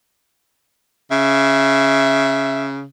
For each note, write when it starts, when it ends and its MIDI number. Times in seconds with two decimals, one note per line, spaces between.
1.11 2.84 49
1.11 2.65 76